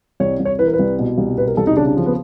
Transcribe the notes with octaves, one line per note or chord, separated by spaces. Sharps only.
C2 C#5
C2
C#5
E3 B4
A#4
B4
C2
B2
C2
B2 B4
A#4
C2 A4
D#4
C#3 D4
D4
F3
B3